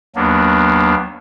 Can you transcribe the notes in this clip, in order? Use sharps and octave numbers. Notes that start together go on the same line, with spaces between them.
D#2 F#3 A#3 B3 D4